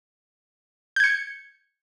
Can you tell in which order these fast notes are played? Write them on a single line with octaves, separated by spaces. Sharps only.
G6 G#6 C#7